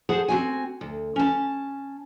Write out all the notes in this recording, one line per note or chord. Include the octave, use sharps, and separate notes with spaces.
G#4 C5 F#5 A5
C4 F#4 G#5
D2
C#4 A5